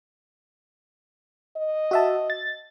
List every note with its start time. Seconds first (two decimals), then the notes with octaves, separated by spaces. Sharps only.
1.56 D#5
1.91 F#4 E5 A5
2.30 A6